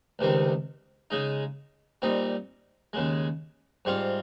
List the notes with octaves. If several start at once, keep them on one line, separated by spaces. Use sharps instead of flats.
C#2 C3 D#3 G3 C4
C#3 G#3 D#4
A#2 G3 C4 D#4
D#2 C#3 G#3
G#2 G3 C4 F4